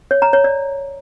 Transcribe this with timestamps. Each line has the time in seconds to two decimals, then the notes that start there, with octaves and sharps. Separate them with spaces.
0.11 C#5
0.22 A#5
0.33 C#5
0.44 D5